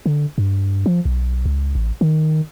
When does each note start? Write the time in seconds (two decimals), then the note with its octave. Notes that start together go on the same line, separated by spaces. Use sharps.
0.06 D3
0.38 G2
0.86 F3
1.05 B1
1.45 C#2
1.75 A1
2.01 D#3